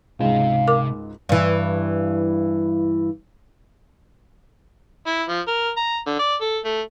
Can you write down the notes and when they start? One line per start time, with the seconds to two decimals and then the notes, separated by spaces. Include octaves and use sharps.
0.20 C#2 G#2 C3 C5 F5
0.68 A#4 D6
1.29 G2 E3
5.07 E4
5.29 F3
5.47 A#4
5.77 A#5
6.06 D3
6.19 D5
6.41 A4
6.65 A3